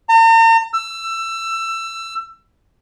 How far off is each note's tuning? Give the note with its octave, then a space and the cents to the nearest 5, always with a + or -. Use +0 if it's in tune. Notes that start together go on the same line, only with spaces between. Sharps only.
A#5 -45
E6 +20